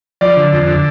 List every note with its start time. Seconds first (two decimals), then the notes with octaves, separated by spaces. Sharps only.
0.21 F3 D5
0.37 D3
0.53 F2
0.67 D3